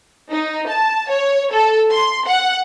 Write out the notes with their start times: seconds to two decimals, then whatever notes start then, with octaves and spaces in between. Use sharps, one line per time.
0.30 D#4
0.67 A5
1.09 C#5
1.51 A4
1.91 C6
2.27 F#5